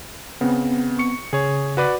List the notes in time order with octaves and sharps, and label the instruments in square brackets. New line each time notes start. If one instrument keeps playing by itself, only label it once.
[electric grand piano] C#3 [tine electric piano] B3 C4
[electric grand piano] C#6 C#7
[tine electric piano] C#3 [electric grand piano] G#4 C#5
[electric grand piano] F#4 B4 D5